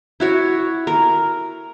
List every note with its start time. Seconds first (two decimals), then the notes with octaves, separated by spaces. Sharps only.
0.20 E4 F#4 C#5
0.87 A#4